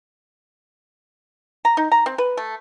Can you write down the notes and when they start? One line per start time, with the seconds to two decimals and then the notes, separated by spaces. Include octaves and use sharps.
1.65 A#5
1.77 D#4
1.92 A#5
2.06 C4
2.18 B4
2.37 A3